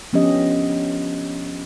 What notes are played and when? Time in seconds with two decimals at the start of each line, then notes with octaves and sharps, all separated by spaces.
0.13 F3 B3 C#4 D4 G4 D#5